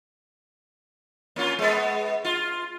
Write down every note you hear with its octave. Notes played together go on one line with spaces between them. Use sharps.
A#3 C#4 F4
G#3 B3
F4